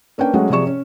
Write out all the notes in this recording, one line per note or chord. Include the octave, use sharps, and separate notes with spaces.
A#3 C#4 D4 B4 G5
F#3 G#3 A3 C#4 F#5
C3 F3 G#4 D5 C#6 E7
C#4